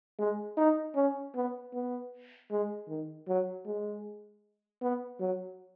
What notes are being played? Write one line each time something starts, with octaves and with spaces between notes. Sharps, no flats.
G#3
D#4
C#4
B3
B3
G#3
D#3
F#3
G#3
B3
F#3